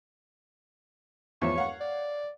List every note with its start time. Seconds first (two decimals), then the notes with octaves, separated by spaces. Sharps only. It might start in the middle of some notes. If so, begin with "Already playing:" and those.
1.42 E2 F3 C#5 C#6
1.55 C#5 F5 F#5
1.80 D5